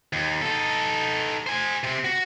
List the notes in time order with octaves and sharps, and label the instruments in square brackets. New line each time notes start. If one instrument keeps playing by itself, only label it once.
[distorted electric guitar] D#2
D#4 A4
C5 G#5
C3 C4
F#4